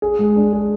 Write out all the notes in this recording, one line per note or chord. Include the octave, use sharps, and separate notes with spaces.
G#4
G#3
D4
G#4